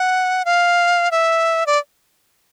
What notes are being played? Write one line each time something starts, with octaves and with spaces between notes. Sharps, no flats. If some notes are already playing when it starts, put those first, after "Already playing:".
Already playing: F#5
F5
E5
D5